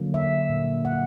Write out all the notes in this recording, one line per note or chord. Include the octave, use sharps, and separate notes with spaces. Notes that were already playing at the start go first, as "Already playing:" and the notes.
Already playing: D3 F#3 A#3
E5
A#2 G3 A#3
F#5